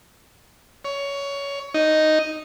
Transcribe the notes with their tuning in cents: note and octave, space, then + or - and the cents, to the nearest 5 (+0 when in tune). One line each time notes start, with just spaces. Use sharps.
C#5 +15
D#4 +0